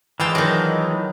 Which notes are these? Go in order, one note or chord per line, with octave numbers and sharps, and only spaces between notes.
E3 F3 G#3 F5 G5 A5
D#3 F#3